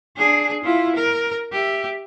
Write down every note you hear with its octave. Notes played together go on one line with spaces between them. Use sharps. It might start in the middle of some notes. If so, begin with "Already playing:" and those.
D4 G#4
E4 F4
A#4
G4 E5